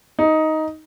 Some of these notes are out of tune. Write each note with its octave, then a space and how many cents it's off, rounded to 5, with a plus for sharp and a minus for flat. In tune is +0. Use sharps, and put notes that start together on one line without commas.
D#4 +10